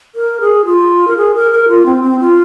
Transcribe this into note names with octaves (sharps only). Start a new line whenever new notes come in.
A#4
G#4
F4
A#4
G#4
A#4
A#4
F4
C4
C4
F4